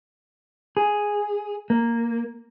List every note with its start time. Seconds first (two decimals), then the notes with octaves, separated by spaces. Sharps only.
0.77 G#4
1.70 A#3